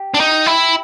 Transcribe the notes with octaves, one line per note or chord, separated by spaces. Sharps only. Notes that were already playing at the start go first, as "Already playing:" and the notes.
Already playing: G4
D4
D#4
E4